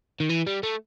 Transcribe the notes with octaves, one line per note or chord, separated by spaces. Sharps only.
D#3
E3
G3
A3